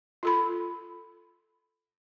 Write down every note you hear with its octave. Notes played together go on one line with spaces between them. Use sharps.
F4 A4 B5